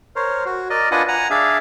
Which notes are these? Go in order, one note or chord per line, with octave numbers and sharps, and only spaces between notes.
A#4 C5 C#5
F#4
A#4 D5 D#5
D4 F4 B4 D#5 F#5 G#5
F#5 G#5 A#5
D4 G#4 D5 E5 F5